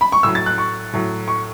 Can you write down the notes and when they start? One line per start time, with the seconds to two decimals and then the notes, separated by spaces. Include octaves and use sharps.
0.01 B5
0.12 C#6
0.23 A2 F#3 E6
0.35 A6
0.46 F#6
0.58 C#6
0.93 A2 F#3
1.28 C#6